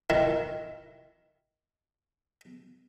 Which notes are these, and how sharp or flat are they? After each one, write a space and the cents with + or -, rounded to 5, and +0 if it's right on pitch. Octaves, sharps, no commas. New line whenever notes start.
D#3 +5 E4 +0